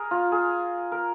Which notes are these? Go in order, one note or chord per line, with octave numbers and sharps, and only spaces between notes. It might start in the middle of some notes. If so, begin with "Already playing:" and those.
Already playing: G#4 A#4
F4
G#4
A#4